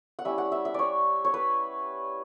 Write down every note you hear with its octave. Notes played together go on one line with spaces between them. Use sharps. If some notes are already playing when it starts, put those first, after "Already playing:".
F#5
G3 C#4 E4 E5
F#5
E5
E5
C#5 D5
C#5
B4